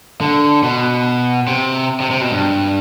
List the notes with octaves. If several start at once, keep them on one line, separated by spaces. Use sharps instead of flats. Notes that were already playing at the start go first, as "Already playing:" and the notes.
D3
B2
C3
C3
C3
B2
G2